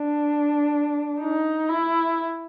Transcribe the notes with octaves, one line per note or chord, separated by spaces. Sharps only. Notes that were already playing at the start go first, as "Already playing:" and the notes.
Already playing: D4
D#4
E4